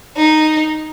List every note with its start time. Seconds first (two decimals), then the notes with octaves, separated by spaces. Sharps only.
0.17 D#4